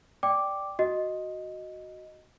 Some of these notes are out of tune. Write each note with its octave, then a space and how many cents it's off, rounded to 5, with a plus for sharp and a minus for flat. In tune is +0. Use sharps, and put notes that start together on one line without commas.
D5 +0 G5 +0 D6 +0
F#4 +0 D#5 +0